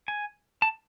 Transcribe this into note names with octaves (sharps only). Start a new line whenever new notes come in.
G#5
A5